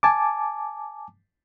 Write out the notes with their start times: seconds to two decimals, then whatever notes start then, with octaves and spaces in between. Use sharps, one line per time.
0.03 G#5 A5 D6